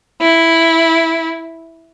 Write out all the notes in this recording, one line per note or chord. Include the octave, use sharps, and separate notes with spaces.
E4